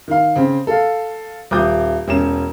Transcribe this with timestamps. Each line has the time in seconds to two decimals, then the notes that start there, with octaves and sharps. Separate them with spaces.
0.08 D#3 F5
0.36 C#3 C4
0.67 A4 F5
1.51 D#1 D6 D#6 G6
2.08 E1 C#4 E7